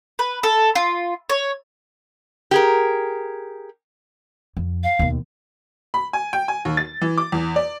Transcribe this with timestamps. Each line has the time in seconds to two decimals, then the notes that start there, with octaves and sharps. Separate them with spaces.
0.19 B4
0.43 A4
0.75 F4
1.29 C#5
2.51 G4 G#4 A#4
4.57 F2
4.84 F5
4.99 D#2 B2
5.94 B5
6.13 G#5
6.33 G5
6.48 G#5
6.65 D#2
6.77 A6
7.01 E3
7.18 D6
7.32 E2
7.56 D5